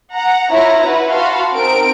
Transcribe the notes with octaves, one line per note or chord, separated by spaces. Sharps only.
F#5 A#5
E4 F4 C#5 A#5
E4 F#4 B4
F#4 F5 A5 B5 C6
C4 D#4 A#4 D7